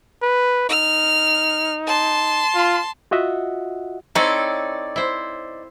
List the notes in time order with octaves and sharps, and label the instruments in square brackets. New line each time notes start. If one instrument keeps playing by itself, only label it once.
[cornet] B4
[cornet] D#4 [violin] F6
[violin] A5 C6
[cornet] F4
[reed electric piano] F4 F#4 D#5 E5 F#5
[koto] C4 E4 A4 [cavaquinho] D#4 C#5 D5
[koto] E4 C5